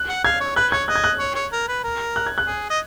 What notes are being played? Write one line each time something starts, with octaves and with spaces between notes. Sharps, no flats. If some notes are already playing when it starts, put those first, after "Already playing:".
Already playing: F#6
F#5
F5 G#6
C#5
B4 F#6
C#5 G#6
D#5 F#6
G#6
F#6
C#5
C#5
A#4
B4
A#4
F#6
G#6
F#6
G#4
D#5